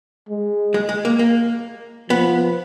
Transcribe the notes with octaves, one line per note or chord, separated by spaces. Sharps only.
G#3
G#3
G#3
A#3
A#3
F3 B3